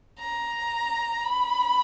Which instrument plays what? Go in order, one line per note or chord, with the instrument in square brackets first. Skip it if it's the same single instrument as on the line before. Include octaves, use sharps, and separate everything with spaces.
[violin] A#5
B5